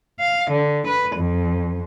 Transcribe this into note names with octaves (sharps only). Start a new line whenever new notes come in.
F5
D3
B4
F2